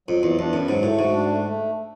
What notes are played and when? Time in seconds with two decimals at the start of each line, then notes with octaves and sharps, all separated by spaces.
0.08 F2 F#3
0.23 E2 F#3
0.39 E2 D4
0.53 F#2 B3
0.68 G#2 F#3
0.83 A2 A3
0.98 G#2 F#4
1.13 D4
1.29 A3
1.44 A3